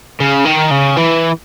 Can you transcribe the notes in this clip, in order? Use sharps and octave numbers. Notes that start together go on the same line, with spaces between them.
C#3
D#3
C#3
E3